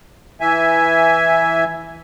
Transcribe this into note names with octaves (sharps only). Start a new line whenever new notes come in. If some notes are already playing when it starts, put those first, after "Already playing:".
E3 E5 G#5